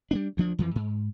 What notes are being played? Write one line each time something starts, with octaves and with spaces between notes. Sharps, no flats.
G3 B3 D4
D2 F3 D4
F2 E3 F3
G#2